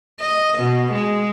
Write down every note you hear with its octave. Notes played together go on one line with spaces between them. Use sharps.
D#5
B2
G#3